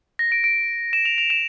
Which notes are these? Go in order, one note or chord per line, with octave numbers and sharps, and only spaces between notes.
A#6
D7
D7
E7
F7
F7
E7